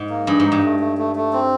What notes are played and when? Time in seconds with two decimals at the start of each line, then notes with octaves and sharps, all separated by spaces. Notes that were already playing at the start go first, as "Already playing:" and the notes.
Already playing: G#2
0.10 A#3
0.27 G2 G#4
0.40 G#2
0.45 D#4
0.52 G2
0.63 A3
0.80 A3
0.98 A3
1.16 A3
1.33 C4